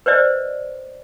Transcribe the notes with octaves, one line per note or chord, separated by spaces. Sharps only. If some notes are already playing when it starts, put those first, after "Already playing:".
B4 C5 D5 D#5